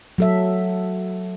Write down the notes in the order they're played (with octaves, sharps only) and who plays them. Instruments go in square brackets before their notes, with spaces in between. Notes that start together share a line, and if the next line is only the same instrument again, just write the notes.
[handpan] F#3 A4 E5